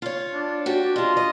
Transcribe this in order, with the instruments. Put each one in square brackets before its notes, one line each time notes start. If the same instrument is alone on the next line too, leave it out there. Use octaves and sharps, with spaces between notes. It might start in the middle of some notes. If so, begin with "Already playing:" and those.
[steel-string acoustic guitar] F4 C#5
[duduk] D4
[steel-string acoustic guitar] F#4 G4
[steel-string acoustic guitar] D4 D#5 [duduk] F4
[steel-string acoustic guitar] D#5